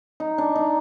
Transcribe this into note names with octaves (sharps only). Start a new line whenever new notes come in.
D#4
D4
D#4